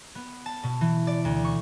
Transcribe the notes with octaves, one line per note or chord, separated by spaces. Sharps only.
B3
A5
B2
E3
D5
D2
C#6